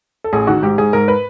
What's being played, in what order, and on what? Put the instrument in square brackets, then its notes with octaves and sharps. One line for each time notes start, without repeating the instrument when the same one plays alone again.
[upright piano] A4
A1 G#4
D#3 F#4
G#2 G4
G#2 G#4
G#2 A#4
B4